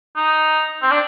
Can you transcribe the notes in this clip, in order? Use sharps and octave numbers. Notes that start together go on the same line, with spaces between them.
D#4
C4
D4